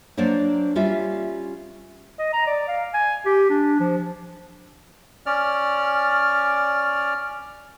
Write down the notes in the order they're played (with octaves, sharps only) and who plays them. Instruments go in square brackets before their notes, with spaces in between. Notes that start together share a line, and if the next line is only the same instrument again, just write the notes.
[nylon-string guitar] F#3 A#3 D4 C5 D5
G3 C#4 F4 E5 F5
[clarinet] D#5
A#5
D5
F5
G#5
G4
D4
F3
[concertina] C#4 D5 F6